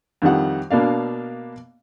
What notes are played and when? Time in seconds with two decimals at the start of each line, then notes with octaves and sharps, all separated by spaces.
0.22 F2 D#3 G3 F#5
0.71 B2 A#3 D4 F5